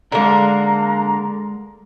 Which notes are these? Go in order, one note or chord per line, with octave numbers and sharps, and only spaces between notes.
D3 G#3 A#3 A#4 A#5